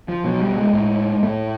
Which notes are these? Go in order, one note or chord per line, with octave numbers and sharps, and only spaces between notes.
F3
B2 F#3
G3
G#3
A2
A2 A3